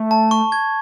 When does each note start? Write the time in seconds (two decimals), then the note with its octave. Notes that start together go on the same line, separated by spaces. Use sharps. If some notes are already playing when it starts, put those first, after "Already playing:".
Already playing: A3
0.11 A5
0.31 C#6
0.52 G#6